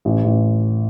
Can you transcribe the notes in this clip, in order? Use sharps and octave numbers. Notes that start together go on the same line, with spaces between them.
A1
A1